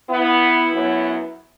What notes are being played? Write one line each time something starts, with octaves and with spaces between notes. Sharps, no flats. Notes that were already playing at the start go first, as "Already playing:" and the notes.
B3 E4
F#2 F#3 B3